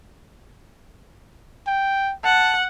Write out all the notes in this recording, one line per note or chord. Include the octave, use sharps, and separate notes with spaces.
G5
F#5 A5